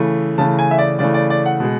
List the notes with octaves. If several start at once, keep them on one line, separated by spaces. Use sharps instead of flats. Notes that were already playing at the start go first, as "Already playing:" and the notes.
Already playing: C#3 E3 A3
C#3 E3 A3 A5
G#5
E5
D5
C#3 E3 A3 D5
D5
D5
F#5
B2 G#3